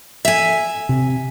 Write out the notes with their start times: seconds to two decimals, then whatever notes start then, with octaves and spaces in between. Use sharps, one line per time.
0.25 E5 G#5
0.89 C3